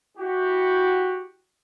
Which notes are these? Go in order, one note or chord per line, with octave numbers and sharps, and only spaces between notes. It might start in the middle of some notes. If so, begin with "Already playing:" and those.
E4 F#4 G4